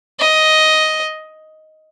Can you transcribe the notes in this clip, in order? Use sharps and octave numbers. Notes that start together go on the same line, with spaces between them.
D#5